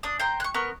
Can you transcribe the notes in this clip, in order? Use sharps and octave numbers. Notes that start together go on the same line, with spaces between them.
D4 D#6
C5 G5 A#5
C#6 F#6
B3 A#4 C#6